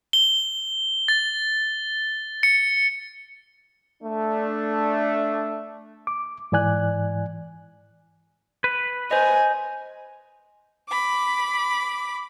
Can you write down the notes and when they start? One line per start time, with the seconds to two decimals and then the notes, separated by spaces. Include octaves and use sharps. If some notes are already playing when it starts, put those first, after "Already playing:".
0.13 G7
1.08 A6
2.43 C#7
4.03 A3 D4
6.07 D6
6.52 G#2 E3 D5 G#5 F#6
8.64 B4
9.11 C5 D#5 G#5
10.89 B5 D6